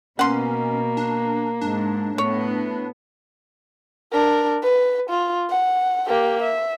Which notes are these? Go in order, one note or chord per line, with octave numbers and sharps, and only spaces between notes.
B2 A#3 C#4 F#5 C6
D4
G#2 D4
A2 B3 C#5
D4 A#4
B4
F4
F#5
A#3 G4
E5